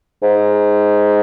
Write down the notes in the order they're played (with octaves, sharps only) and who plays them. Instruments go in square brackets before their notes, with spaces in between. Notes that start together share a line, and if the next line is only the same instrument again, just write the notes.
[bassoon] G#2